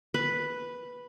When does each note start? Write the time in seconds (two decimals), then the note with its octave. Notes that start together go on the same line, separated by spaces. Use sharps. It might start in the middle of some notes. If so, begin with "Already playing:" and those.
0.14 B4